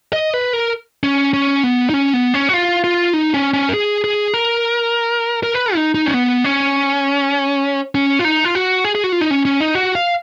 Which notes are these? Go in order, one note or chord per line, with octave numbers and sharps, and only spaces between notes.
D#5
B4
A#4
C#4
C#4
B3
D#4
C#4
B3
C#4
F#4
F4
F4
D#4
C#4
C#4
A#4
G#4
G#4
A#4
A#4
B4
D#4
D#4
C#4
B3
C#4
C#4
F4
D#4
F4
F#4
G#4
G#4
F#4
F4
D#4
C#4
C#4
D#4
F#4
F5